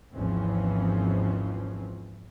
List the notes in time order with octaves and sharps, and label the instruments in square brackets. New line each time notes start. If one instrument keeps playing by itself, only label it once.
[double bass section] G#1 D#2 E3 F3 C4 C#4